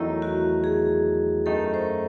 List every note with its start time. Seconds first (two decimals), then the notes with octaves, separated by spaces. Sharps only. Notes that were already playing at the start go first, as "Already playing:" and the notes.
Already playing: E2 D#3 F#3 A3 D#4 E4
0.22 F#4
0.64 G#4
1.46 F#2 D#3 A3 D#4 A4
1.74 C5